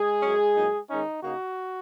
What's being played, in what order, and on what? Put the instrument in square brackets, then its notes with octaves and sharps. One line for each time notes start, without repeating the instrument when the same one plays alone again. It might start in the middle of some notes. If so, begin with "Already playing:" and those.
Already playing: [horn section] G#3 G#4
F#2 F#3 C#4
A#2 F#3 D#4
D#3 G#3 C#4 D#4
C#3 A#3 D#4 F#4